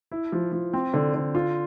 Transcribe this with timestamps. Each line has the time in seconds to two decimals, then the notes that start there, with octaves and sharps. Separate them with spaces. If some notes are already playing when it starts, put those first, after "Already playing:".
0.12 E4
0.32 F3
0.52 F3
0.73 C4
0.94 D3
1.14 D3
1.35 F4